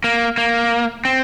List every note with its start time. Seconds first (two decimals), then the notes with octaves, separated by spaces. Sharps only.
0.04 A#3
0.38 A#3
1.05 C4